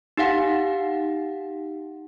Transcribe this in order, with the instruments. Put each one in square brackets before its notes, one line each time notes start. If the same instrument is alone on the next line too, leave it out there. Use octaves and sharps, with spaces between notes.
[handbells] D#4 G4 F5 F#5